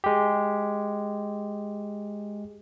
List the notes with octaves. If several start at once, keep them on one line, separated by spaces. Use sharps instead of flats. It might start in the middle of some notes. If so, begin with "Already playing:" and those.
G#3 G4